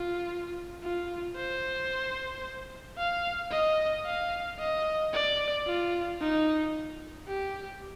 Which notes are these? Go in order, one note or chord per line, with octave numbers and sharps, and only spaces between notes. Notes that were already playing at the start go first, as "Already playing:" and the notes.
Already playing: F4
F4
C5
F5
D#5
F5
D#5
D5
F4
D#4
G4